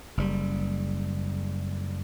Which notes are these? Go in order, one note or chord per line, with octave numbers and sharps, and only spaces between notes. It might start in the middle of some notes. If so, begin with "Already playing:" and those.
F#1 G3